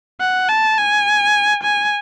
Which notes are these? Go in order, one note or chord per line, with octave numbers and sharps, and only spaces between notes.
F#5
A5
G#5
G#5